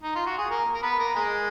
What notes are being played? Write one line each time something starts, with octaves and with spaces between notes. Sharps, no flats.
D#4
F4
F#4
G#4
A#3 A#4
A#4
B3 B4
A#3 A#4
G#3 G#4